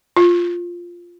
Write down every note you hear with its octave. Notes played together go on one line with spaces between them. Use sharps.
F4